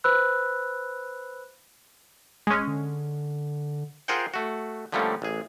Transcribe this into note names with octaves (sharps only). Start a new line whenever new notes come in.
B4 C5 B5 E6 F#6
D#1 G#3 C#4
D3
F4 G#4 A#4 C5 F#5 G5
A3 F#4
D3 F3 G3 A3 A#3 C#4
A1 G#4